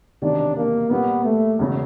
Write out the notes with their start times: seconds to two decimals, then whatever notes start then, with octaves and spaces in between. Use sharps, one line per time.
0.22 E1 E2 C3 D#3 D4
0.56 A#3
0.90 A#2 G3 A#3 B3
1.24 A3
1.59 E1 E2 C#3